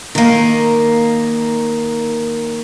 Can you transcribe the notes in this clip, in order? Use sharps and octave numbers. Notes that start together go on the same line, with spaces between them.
D#3 A#3